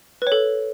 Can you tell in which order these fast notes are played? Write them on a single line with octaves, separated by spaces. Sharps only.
B4 C#5 A4